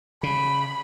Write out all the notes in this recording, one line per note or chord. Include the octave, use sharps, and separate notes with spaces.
C#3 B5